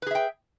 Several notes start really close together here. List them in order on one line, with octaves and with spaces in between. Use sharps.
B4 G#4 E5 G5